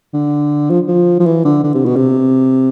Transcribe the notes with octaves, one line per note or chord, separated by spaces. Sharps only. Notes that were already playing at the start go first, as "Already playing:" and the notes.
D3
F3
F3
F3
E3
D3
D3
C3
B2
C3